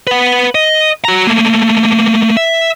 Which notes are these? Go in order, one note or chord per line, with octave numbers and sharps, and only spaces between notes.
B4 F#5
D#5
F#4 A#5
A3 A#3
E5